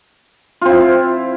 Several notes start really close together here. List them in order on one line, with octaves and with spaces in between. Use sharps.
F4 C4 E4